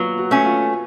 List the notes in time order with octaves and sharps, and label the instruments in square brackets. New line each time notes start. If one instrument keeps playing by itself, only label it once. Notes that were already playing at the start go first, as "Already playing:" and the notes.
Already playing: [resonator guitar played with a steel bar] F#3 [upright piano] A#3 B3 F4
[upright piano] F#4
[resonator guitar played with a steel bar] A3 C#4
[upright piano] F4